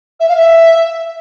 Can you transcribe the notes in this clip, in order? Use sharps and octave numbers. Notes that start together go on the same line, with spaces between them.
E5
F5
E5